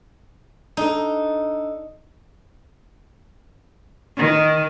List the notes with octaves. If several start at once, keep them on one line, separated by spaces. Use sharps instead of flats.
D4 D#4 A4
D#3